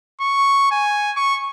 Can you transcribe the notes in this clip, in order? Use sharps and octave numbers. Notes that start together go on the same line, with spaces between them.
C#6
G#5
C#6